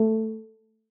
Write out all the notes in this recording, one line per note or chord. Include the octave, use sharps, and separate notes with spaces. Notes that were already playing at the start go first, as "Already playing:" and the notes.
Already playing: A3